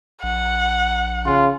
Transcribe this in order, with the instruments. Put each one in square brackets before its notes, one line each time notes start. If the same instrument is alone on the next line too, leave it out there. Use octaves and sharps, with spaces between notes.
[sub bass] A#1 [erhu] F#5
[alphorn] C#3 [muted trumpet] F4